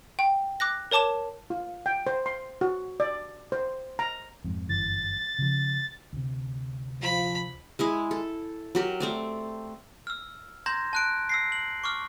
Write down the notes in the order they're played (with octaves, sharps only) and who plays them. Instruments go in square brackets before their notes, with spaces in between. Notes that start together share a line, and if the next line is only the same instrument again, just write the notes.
[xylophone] G5
D6 F#6 A#6
A#4 C#5 A5 D6 E7
[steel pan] F4
G5
C5
C6
F#4
D5
C5
A#5
[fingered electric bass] F2 G#2
[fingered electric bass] G1 F#2 E3 [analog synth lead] A6
[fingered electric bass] C#3 F3
[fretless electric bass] D2 C3
[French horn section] F3 [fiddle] B5
[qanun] G#3 E4 G#4
A4
F#3 G4 A#4
A3 C4 D5
[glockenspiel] E6 F6
A#5 C6 G6 G#6 A#6
A5 F#6 D7
E6 A#6 C7
F#7
C#6 D6 F6